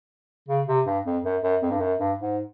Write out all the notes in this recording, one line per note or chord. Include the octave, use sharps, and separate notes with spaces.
C#3
C3
G2
F2
F#2
F#2
F2
G2
F#2
G2
G#2